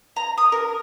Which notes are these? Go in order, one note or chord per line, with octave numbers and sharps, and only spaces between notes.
A#5
D#6
A#4